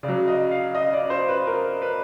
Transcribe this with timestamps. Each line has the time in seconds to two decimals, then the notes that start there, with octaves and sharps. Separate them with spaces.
0.03 C#3 D5
0.08 F#3
0.28 D#5
0.51 F5
0.75 D#5
0.93 D5
1.10 C5
1.28 B4
1.47 A#4
1.82 B4